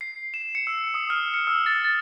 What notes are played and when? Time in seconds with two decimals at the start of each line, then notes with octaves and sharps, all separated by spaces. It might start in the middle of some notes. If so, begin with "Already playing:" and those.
0.01 C7
0.34 E7
0.55 C#7
0.67 E6
0.94 D#6
1.10 F6
1.34 C#7
1.47 E6
1.66 A6
1.85 A6